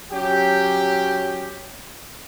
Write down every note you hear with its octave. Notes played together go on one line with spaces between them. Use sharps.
F#3 C#4 G4